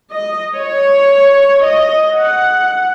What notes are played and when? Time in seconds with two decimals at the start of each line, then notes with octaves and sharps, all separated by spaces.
0.12 D#5
0.55 C#5
1.63 D#5
2.16 F#5